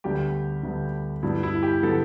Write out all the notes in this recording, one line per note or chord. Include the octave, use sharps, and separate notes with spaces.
D2 D3 G3 B3 G4
D2 D3 G3 B3
G2 D3 G3 B3 E4
E4
G4
D3 G3 B3 A4